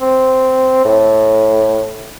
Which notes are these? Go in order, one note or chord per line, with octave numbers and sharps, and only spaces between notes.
C4
A2